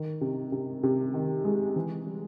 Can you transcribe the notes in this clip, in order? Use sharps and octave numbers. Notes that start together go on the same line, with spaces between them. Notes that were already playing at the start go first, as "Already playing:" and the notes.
Already playing: D#3
C3
C3
C3
D#3
G#3
E3
G3